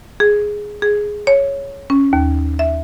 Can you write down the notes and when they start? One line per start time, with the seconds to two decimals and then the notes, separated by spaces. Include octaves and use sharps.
0.20 G#4
0.82 G#4
1.27 C#5
1.90 C#4
2.13 D#2
2.59 E5